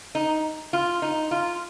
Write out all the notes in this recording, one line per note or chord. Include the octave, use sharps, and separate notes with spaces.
D#4
F4
D#4
F4